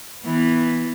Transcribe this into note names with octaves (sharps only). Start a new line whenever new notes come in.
E3 B3